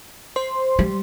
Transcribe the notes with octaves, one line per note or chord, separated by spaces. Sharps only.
C5 C6
G3